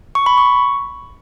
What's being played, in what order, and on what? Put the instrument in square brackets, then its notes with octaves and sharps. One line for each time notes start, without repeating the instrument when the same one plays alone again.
[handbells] C#6
B5
C#6